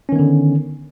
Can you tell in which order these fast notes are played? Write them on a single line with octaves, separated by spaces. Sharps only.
C#4 D#3 B3 D3